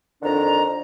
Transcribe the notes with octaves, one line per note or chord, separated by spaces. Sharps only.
F2 D3 D#3 D4 A#5